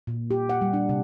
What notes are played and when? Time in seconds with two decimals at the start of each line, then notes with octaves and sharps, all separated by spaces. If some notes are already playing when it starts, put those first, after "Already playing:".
0.07 A#2
0.31 G4
0.49 F#5
0.61 G3
0.73 D4
0.89 C3